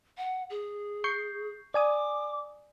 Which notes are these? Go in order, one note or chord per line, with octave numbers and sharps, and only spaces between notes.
F#5
G#4
C#6 G6 C7
D5 G#5 D6 D#6